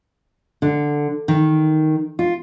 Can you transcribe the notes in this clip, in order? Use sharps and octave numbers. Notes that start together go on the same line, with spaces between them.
D3
D#3
F4